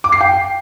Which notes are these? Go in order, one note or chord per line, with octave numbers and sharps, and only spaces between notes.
D6
C7
G5